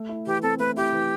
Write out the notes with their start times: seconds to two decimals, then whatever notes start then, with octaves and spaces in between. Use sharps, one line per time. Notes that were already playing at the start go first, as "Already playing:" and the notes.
Already playing: A3
0.09 E4
0.26 E3 G4
0.42 C4 A4
0.59 A3 B4
0.77 E4 G4
0.92 E3